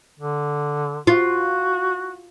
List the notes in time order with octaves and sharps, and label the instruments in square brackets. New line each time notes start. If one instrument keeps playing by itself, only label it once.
[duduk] D3
[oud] F4 [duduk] F#4